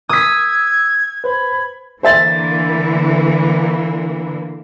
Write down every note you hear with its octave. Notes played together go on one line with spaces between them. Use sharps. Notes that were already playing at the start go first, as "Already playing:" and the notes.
D#6 E6 G#6 B6
B4 C5 B5
D3 E3 A#3 C5 E5 A6